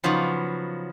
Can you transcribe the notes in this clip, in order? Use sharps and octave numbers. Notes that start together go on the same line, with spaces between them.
C#3 F3 F#3 B3 D#4